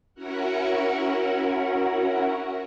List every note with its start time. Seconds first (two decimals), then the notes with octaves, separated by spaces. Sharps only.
0.14 C#4 E4 F#4 A#4 F#5